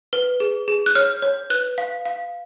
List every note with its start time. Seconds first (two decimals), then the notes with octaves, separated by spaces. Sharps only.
0.13 B4
0.40 G#4
0.68 G#4
0.86 F#6
0.95 C#5 F6
1.22 C#5
1.50 B4 F#6
1.78 F5
2.05 F5